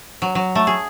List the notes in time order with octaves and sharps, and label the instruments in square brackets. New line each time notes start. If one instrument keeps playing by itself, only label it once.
[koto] F#3
F#3
A3
G#4